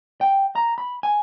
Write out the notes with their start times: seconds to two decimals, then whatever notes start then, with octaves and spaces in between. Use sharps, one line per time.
0.21 G5
0.55 A#5
0.78 B5
1.03 G#5